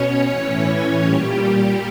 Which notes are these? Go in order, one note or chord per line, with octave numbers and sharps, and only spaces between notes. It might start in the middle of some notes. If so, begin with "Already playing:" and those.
Already playing: B2 C#4 C#5
A2 E3
A#2 G3 G4